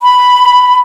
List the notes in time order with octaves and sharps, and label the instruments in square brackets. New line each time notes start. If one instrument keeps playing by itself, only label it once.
[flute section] B5